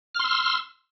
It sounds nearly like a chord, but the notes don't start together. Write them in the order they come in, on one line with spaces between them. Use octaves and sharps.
F6 C6 E6